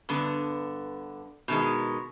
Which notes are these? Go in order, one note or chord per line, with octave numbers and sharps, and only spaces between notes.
G2 D3 B3
B2 D#3 G#3